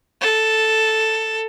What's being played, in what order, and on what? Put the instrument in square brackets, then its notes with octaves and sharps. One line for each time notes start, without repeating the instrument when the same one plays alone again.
[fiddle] A4